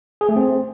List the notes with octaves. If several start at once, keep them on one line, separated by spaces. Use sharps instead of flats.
G#4
A3
C4